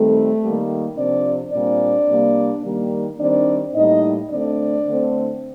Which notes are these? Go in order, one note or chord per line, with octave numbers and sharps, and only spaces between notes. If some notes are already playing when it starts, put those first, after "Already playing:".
Already playing: D#3 G3 A3 C4 A4
D#3 G3 A#3
C3 F3 C4 D4 D5
A#2 G3 C4 D4 D5
C3 G3 A#3
D#3 G3 A#3
D#3 G3 C4 D4 D5
A2 G3 A#3 D#4 D#5
D3 A3 C4 D4 D5
D3 A3 C4